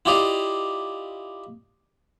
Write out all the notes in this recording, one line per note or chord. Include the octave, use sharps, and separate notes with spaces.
E4 F4 G4 D5 D#5 F5